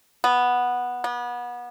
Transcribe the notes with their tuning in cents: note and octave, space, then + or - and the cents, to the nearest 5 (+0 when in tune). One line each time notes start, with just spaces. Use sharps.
B3 -5
B3 -30